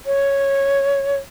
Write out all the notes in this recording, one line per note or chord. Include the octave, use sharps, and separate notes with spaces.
C#5